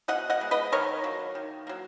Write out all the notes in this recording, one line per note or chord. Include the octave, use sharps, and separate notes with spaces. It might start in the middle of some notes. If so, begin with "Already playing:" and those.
B2 D#5 F#5
D#5 F#5
G#3 B3
B4 D#5
D#3 A#4 C#5
F#3 A#3
D#3
F#3 A#3